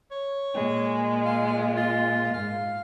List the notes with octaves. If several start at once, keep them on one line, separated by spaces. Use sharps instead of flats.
C#5
A#2 G#3
F5
F4
G#2 F5